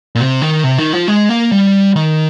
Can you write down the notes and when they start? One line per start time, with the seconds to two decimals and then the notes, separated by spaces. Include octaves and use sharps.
0.15 A#2
0.20 C3
0.42 D#3
0.64 C3
0.78 D#3
0.93 F3
1.08 G#3
1.29 A#3
1.52 G3
1.96 D#3